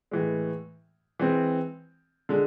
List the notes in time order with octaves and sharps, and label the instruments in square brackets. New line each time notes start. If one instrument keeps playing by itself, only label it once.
[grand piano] A2 E3 G#3
E3 G#3 C4
D3 G#3